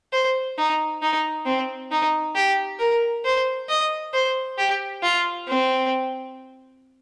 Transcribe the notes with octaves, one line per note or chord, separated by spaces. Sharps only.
C5
D#4
D#4
C4
D#4
G4
A#4
C5
D#5
C5
G4
F4
C4